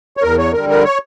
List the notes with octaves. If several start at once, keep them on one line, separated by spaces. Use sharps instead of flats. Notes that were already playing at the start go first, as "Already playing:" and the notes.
C#5
E2 A#4
C#5
D3 G3 A#4
A#4
C#5